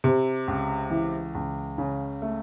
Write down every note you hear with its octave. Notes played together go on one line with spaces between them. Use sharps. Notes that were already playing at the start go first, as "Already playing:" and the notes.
C3
C#2
E3
C#2
C#3
A3